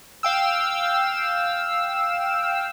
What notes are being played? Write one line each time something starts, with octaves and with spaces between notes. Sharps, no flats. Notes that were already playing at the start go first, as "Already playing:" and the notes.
F5 G5 E6